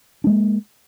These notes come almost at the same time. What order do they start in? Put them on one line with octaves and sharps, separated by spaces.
D4 G#3 A#3